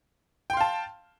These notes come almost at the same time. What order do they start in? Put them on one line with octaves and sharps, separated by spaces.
G5 C6 F5 A5